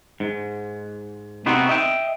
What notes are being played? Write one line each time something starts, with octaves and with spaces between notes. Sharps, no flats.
G#2
C3 B3 C4 D#4 F#4
D#5 E5 G5